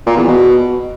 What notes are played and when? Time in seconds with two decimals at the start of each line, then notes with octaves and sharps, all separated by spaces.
0.06 A#2
0.17 E2
0.28 B2